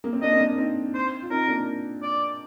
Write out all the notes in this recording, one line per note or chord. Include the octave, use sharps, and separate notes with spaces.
A#3
C4
A#3 D4 D#5
C4
A#3 D4
C4 D#4
C5
F4
C4 D#4 A#4
A#3 D4
D5